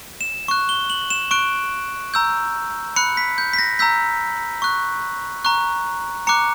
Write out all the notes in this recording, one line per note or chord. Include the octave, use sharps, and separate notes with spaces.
E7
C#6 F#6
G7
F#7
E7
C#6 F#6 D7
A#5 E6 G6
B5 F#6 C#7
B6
G6
B6
A#6
A#5 E6 G6 B6
C#6 F#6
A#5 C#6 F#6
A#5 D6 F#6 C#7